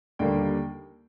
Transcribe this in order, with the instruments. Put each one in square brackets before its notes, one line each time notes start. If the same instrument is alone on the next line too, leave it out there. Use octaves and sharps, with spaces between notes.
[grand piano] D#2 D3 G3 A#3 G5